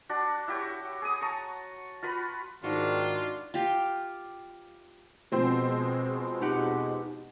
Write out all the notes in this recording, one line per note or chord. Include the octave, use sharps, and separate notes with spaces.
D4 F#4
E4 F#4 G4 C#5
G#4 D#6
A5 A#5 C#6
F4 F#4 B4 B5
G#2 D#3 D4 D#4 F4 F#4
F4 G4
B2 F3 G#3 C4 C5
D#4 G4 F#5